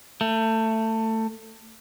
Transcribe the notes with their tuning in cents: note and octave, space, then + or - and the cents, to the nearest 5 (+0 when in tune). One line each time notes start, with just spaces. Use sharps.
A3 +20